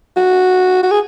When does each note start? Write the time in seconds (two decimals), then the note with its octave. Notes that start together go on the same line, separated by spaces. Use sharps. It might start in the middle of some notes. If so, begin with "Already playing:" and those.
0.17 F#4
0.83 F#4
0.91 G#4